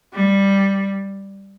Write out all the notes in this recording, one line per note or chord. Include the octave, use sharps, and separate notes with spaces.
G3